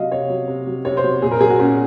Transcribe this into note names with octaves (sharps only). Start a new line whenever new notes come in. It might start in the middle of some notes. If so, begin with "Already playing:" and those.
Already playing: C3 F#3 D#5 F5
C3 C#5
F#3
C3
F#3
C3 C#5
C5
F#3
A#2 G#4
A#4
F#3 G#4
F#4
A#2 C#4